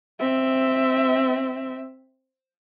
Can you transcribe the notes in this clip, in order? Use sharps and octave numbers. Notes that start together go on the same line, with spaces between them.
C4 E5